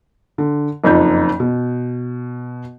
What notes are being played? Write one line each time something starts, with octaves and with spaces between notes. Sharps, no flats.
D3
F#1 F2 D#4 G6
B2